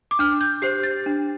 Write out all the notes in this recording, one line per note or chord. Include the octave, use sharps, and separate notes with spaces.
D6
D4 F6
G6
G4 C5 C7
A6
D4